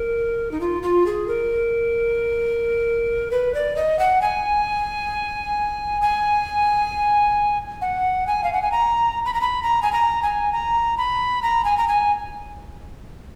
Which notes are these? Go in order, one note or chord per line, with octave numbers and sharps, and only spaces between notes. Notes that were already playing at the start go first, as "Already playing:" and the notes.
Already playing: A#4
D#4
F4
F4
G#4
A#4
B4
D5
D#5
F#5
G#5
G#5
F#5
G#5
F5
F#5
G#5
A#5
B5
A#5
B5
A#5
G#5
A#5
G#5
A#5
B5
A#5
G#5
A#5
G#5